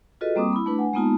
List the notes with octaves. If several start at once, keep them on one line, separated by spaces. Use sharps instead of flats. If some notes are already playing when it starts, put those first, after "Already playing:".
F4 F#4 G#4 A4 B4 D#5
G3 A#3 C4 D6 D#6
E4 B5
A3 D4 B4
F#5 G#5
G#3 A#3 B3 D#4 F4 A5